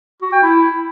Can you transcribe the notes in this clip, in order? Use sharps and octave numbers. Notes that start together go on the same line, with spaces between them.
F#4
G5
E4